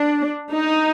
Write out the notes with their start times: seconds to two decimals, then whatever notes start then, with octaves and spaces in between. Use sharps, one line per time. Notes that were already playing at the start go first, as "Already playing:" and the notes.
Already playing: D4
0.51 D#4